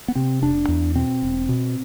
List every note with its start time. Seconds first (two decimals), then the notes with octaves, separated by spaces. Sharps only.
0.08 B3
0.15 C3 C4
0.42 F1 D4
0.68 E2
0.95 B2 C4
1.22 E1
1.49 B2